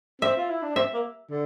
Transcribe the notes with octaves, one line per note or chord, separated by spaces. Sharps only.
C4 E5
F4
E4
D4
C4 E5
A#3
D3